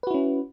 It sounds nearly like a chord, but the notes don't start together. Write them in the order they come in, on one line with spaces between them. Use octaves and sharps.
B4 F#4 E4 C#4